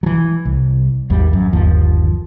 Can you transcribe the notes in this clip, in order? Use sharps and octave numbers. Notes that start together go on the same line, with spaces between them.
E3 F#3
C2
G#1 D#2 G3
F#2
G1 D#2 F3